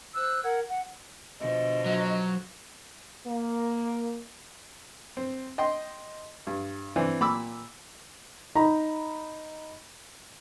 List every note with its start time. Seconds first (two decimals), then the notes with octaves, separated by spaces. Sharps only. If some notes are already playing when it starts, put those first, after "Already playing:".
0.15 C5 E6 F#6
0.43 A#4 F#5 G#6
0.69 F#5
1.40 B2 D3 F3 D#5
1.86 F#3
3.27 A#3
5.17 C4
5.58 D#5 G5 C6
6.47 G2
6.96 E3 C4 D4
7.21 A#2 B5 D6 E6
8.55 D#4 A#5 B5